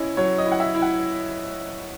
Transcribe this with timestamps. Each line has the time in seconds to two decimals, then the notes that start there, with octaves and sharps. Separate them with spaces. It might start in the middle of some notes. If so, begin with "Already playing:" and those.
Already playing: C#4 E4 D#5
0.17 F#3 C#5
0.38 D#5
0.46 E4
0.52 F#5
0.60 E5
0.75 E4
0.82 F#5